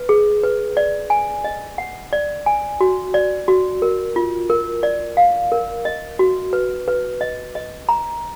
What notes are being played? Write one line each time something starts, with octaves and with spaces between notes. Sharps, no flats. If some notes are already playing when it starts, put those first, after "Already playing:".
Already playing: B4
G#4
B4
D5
G#5
D#5
F#5
D5
G#5
F#4
D5
F#4
A#4
F4
A#4
D5
F5
A#4
D#5
F#4
B4
B4
D#5
D#5
A#5